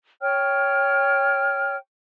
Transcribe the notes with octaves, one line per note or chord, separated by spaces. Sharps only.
C#5 G5 F6